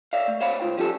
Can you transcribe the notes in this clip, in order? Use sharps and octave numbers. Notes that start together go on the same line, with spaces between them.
C#5 D5 E5 F5
A3
C5 C#5 F5 F#5 B5
C#2 A#2 F4 C5 G5
F3 G3 C#4 G4 A4